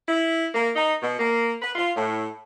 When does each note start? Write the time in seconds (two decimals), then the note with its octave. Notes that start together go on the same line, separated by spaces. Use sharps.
0.08 E4
0.54 A#3
0.76 D#4
1.01 B2
1.18 A#3
1.62 B4
1.75 F4
1.97 A2